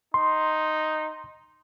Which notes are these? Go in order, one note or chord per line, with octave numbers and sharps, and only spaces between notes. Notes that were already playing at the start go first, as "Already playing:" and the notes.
D#4 C6